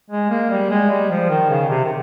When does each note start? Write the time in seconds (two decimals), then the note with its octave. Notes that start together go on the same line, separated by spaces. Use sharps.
0.10 G#3
0.30 A#3
0.50 G3
0.70 G#3
0.90 G3
1.10 F3
1.29 D#3
1.49 C#3
1.69 C3
1.84 D#3